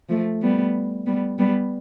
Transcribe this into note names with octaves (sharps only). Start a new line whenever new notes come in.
F3 A3
G3 B3
G3 B3
G3 B3